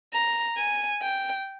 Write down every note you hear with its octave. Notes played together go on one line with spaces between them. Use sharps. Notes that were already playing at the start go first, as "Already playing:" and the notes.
A#5
G#5
G5